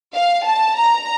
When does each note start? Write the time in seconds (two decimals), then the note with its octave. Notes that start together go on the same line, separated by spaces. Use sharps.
0.16 F5
0.46 A5
0.77 A#5